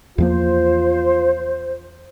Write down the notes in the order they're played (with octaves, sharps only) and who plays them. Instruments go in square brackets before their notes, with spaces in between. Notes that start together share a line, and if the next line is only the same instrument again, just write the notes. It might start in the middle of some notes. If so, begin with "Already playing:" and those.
[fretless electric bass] E2 F3 A#3 [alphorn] F4 [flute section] C5